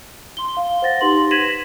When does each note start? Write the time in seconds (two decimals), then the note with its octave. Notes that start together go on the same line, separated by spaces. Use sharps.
0.37 C6 G7
0.57 F5
0.82 C5 F#5 A6 A#6
1.01 D#4 G4 B4 C6 F#7
1.31 G#6 A#6 B6 D#7 E7 F#7